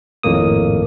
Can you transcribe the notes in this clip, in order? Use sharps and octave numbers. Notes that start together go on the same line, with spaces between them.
G#1 F2 A2 A#3 D#6